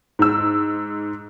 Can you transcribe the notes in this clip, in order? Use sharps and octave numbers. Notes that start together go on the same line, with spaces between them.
G#2 E6